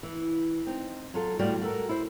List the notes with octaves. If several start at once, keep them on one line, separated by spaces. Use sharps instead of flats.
E3
C4 D#4
F#3 F4 A4
A2 G3 F#4 D5 F5 G5
F#4 A4 A#4
E4 C5